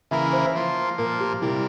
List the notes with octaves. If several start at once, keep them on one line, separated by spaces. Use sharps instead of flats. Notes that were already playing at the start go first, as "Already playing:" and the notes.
C#3 E3 A#3 E4 A#4 E5
C5
F3 A#3 F4
A#2 F3 A#3 A#4
G4
C3 G3 A#3 E4